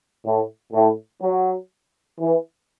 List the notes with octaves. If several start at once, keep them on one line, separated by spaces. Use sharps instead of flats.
A2
A2
F#3
E3